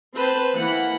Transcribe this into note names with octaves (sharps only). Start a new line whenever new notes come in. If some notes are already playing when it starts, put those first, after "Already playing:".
C4 B4 C5 A5
E3 A#3 F#5 B5